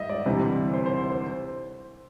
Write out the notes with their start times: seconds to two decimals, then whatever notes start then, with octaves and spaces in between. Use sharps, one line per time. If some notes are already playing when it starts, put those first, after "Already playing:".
Already playing: G#2 G3 D#5 E5
0.09 D5
0.25 D2 C3 E3 G3
0.73 C5
0.86 C5
1.10 C5